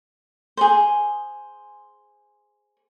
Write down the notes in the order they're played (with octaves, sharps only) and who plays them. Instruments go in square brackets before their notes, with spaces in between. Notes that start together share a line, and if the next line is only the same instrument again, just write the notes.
[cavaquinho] G#4 C5